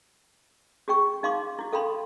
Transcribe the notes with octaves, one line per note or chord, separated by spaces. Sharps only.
F#4 G#4 G5 C#6
D#4 F5 C6 D6
E4 F#4
A4 F5 G5 B5 C6